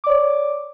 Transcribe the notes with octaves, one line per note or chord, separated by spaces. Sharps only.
C#5 D5 D6